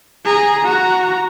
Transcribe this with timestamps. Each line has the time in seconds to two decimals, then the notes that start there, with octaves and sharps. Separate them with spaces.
0.25 G#4 A#5
0.65 F#4 A#5